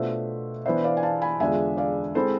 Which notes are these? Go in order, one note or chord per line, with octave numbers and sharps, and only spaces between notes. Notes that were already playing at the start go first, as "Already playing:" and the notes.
Already playing: B2 A3 D4 F4 C5 E5
E3 B3 D4 C5 E5
D5 F5
G#5
F5 A5
G#5 B5
E2 D3 G#3 D4 F4 E5 G#5
D5 F5
G#3 C4 E4 A4 C5